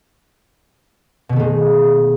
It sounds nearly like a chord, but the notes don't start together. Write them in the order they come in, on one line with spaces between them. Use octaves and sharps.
B2 D#3 A3 G#3